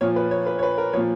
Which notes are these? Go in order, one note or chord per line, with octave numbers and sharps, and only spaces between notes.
A#2 F3 C#5
B4
C#5
B4
C#5
B4
A#4
A#2 F3 C#5